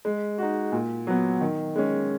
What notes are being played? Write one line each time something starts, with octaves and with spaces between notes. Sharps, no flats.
G#3
D#4 F#4
A#2
F#3 B3
D#3
G#3 C#4